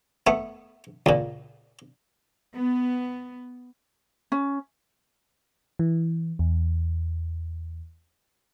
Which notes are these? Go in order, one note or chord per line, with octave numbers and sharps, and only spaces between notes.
A3 B3
C#2 A#2
B3
C#4
E3
E2